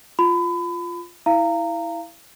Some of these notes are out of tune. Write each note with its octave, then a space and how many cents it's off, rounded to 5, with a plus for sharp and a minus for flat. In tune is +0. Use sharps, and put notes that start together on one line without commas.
F4 +0 B5 +30
E4 -15 F5 -30 A#5 -20